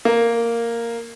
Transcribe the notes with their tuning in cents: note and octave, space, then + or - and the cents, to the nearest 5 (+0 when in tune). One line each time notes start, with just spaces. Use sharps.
A#3 -5